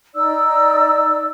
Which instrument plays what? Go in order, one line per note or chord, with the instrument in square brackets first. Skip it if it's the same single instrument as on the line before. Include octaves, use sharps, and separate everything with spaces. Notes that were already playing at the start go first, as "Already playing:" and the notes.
[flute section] D#4 D5 E6